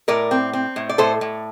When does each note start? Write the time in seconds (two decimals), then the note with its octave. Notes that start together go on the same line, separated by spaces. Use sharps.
0.08 A2 A#4 D5
0.31 C4
0.53 C4
0.76 A2
0.89 D5
0.98 A2 A4 C5
1.21 A2